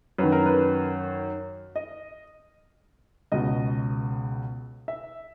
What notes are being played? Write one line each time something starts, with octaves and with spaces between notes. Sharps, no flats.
F#2 D#3 B4
A#4
B4
D#5
C#2 B2 D#5
E5